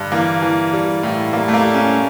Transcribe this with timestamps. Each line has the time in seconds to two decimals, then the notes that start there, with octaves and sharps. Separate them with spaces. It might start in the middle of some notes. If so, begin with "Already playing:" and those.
Already playing: G2 D3
0.12 E3 A#3
0.42 E3
0.73 G3
1.03 A2
1.33 G3 A#3
1.48 A3
1.54 A#3
1.64 G3
1.74 C#4
1.94 G3